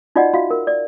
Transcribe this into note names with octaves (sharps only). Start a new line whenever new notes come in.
D#4 F4 F#4 D5 D#5 F#5
F4 F#4 E5 F5
A#4
D5